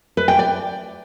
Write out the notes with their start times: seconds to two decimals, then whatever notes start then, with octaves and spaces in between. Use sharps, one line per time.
0.17 B4
0.28 G5
0.39 D5